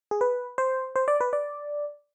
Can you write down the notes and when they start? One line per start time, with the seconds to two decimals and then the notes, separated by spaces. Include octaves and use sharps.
0.11 G#4
0.21 B4
0.58 C5
0.96 C5
1.08 D5
1.21 B4
1.33 D5